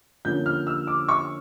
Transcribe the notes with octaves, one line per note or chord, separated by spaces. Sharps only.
D3 F3 A#3 C#4 G6
F6
E6
D6
C#6